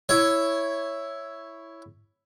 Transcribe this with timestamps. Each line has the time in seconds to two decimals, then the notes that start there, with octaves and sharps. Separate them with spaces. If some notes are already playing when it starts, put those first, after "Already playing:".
0.09 E4 C#5